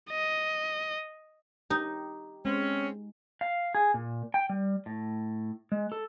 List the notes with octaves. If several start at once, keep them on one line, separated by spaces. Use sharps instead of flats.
D#5
D#4 G4
G#3 C4 C#4
F5
G#4
A#2
G5
G3
A2
G#3
A4